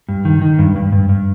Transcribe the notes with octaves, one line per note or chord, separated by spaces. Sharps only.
G2
D#3
D#3
G2
G2
G2
G2